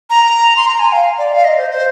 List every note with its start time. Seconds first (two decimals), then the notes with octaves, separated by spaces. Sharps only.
0.10 A#5
0.57 C6
0.68 A#5
0.79 G#5
0.93 F5
1.18 D5
1.32 F5
1.44 D#5
1.57 C5
1.71 C5